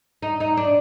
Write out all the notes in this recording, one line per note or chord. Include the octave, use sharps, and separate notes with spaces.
D#4
D#4
D4